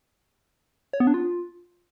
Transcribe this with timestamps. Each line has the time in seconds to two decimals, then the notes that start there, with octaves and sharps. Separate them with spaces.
0.93 C#5
1.00 B3
1.07 D4
1.14 F4